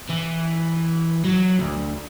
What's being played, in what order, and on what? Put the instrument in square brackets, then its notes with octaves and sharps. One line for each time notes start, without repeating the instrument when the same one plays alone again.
[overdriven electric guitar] E3
F#3
D2